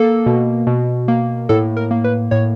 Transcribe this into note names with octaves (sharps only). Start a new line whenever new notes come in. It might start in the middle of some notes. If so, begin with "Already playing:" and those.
Already playing: A#3 A4
B2
B2
A#3
A2 A4
A#4
A#3
B4
A2 C#5